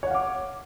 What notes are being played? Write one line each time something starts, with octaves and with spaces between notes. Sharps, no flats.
C#5 F5 F#5 D6